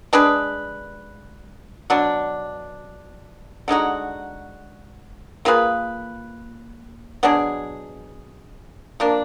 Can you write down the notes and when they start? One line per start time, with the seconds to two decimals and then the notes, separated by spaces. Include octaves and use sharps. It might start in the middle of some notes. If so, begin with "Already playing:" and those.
0.13 G#3 D4 G#4 B4
1.90 B2 F#3 D4
3.68 D3 G#3 D#4 F#4
5.45 A#3 F4 G#4 B4
7.23 B2 F#3 D4 G#4
9.00 F3 A#3 D4